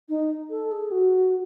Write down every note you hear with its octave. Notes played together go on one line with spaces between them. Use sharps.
D#4
A4
G#4
F#4